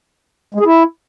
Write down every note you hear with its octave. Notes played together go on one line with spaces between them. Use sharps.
G#3
G#4
E4